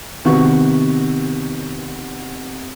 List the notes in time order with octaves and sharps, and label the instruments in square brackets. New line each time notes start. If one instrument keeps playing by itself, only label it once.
[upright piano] C3 D#3 B3 F#4 C#6